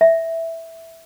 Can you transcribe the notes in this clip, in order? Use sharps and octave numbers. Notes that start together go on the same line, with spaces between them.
E5